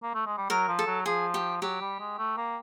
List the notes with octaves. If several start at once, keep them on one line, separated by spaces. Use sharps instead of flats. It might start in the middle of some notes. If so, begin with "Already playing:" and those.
A#3
A3
G#3
G3
F#3 A#4
F3
A4
F#3
F3 G#4
G4
F#3 G4
G3
G#3
A3
A#3